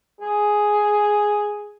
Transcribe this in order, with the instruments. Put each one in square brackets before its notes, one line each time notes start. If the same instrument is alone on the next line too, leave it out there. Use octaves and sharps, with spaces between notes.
[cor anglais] G#4